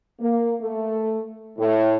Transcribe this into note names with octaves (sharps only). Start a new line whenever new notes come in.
A#3
A3
A2